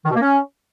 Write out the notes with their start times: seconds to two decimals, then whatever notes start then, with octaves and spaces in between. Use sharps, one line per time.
0.05 D#3
0.11 B2
0.16 A#3
0.21 C#4